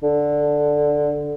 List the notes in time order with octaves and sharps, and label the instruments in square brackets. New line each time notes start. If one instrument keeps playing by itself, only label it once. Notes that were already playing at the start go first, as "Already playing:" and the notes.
[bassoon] D3